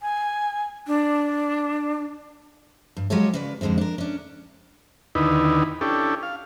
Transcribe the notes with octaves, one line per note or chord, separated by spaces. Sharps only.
G#5
D4
G2
F#3 G#3 F4 G4 A4 C#5
C#3 B4 D5
F2 A#2 D3 G#3 C4
D4 A#4
C#4 D4
D#2 D3 D#4 E4 B4
C#4 D4 E4 G4 A4
F5